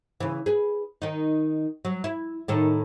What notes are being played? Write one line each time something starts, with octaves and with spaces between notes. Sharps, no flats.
C#3 E3
G#4 B4
D#3 D#4
F#3
E4
A2 D#3 A4